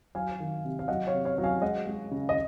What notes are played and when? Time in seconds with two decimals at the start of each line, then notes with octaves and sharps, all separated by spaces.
0.15 F#3 F5 G#5
0.40 D#3
0.65 C3
0.79 F5
0.88 F#3 D#5 F#5
1.07 C#5 F5
1.13 C3
1.25 C#5 F5
1.38 F#3
1.44 F5 G#5
1.62 G#3 D#5 F#5
1.87 G#3
2.11 C#3
2.29 D#5